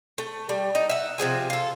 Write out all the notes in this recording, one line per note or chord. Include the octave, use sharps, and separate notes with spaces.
A3
G3
D#4
E5 F#5
C3 F3 G#4 G#5
F4 A4